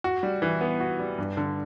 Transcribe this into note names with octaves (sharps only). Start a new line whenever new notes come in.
F#4
G3
E3
B3
F#4
G3
G2
D3